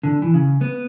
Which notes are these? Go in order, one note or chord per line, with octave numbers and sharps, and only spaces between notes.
D3
E3
C#3
B3